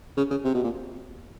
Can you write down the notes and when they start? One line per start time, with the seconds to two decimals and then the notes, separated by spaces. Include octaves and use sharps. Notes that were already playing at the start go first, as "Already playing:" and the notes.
0.17 C#3
0.31 C#3
0.45 C3
0.54 B2
0.64 A#2